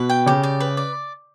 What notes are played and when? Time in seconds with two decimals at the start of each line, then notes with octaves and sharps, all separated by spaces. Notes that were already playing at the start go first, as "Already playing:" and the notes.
Already playing: B2 B4
0.09 G5
0.26 C#3 G4
0.43 D5
0.60 B4
0.77 D5